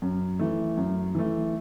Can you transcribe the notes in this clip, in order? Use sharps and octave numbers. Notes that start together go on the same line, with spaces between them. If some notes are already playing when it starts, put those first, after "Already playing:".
F#2
E3 A3
F#2
E3 A3